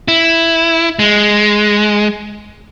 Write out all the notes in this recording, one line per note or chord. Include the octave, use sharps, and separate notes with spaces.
E4
G#3